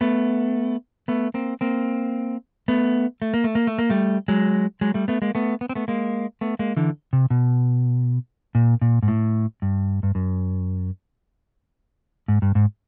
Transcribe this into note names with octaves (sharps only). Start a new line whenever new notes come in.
A3 B3
A3 B3
A#3 C4
A#3 C4
A3 B3
A3
A#3
A3
A#3
A3
A#3
G3 A3
F#3 G#3
F#3 G#3
G3 A3
A3 B3
G#3 A#3
A3 B3
B3
C4
A3 B3
G#3 A#3
A3 B3
G#3 A#3
D3 E3
C3
B2
A#2
A#2
G#2
A2
G2
G2
F#2
G#2
G2
G#2